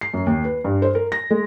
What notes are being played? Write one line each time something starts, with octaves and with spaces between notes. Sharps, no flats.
C7
F#2
D#2
B4
G2
C5
A#4
A#6
G#3